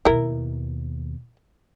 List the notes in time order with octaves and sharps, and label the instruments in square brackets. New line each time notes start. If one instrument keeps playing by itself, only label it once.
[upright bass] D#2 B2 [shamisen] E4 A#4